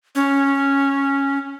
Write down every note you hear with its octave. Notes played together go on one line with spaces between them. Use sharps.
C#4